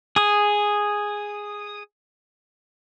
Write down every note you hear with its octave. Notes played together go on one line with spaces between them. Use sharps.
G#4 D#6